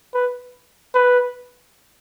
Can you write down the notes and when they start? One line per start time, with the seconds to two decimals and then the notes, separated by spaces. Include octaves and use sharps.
0.14 B4
0.95 B4